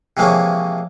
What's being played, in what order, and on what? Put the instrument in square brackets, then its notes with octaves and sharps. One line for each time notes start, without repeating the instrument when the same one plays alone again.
[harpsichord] C3 E3 F3 G#3 A#3 C#4